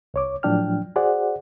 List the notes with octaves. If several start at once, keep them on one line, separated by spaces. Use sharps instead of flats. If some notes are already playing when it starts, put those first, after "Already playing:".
C2 C#5 D6
A2 F3 F#3 D4 G5 F6
F#4 G#4 C5 D5 F#5